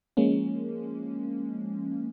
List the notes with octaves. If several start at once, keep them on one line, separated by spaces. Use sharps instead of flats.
F3 G#3 A#3 C#4